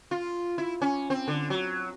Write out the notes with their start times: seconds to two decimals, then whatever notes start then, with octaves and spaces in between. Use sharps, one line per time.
0.11 F4
0.58 E4
0.82 C#4
1.10 C4
1.28 D3
1.50 F#3